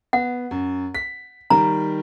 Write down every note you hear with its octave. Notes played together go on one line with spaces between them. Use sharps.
B3 F#5
F#2
B6
D#3 G3 A#5